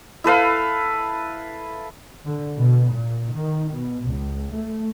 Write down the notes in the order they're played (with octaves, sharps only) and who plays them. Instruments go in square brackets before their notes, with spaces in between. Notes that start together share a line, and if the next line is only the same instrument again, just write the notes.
[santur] E4 A4 B4 F5
[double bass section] D3
B2
A#2
D#3
B2
C#2
A3